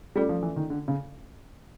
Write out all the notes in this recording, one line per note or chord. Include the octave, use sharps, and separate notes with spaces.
G3 A3 C#4 F4 A4 D5
F3
E3
D#3
D3
C#3